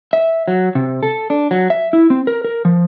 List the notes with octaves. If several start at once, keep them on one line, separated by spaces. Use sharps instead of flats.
E5
F#3
C3
A4
D4
F#3
E5
E4
C4
A#4
A#4
F3